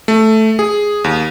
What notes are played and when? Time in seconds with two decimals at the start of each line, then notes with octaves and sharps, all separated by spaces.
0.08 A3
0.59 G#4
1.04 D#2